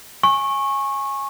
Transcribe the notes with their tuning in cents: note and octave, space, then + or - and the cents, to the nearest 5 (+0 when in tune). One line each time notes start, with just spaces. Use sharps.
G#5 +0 C#6 -20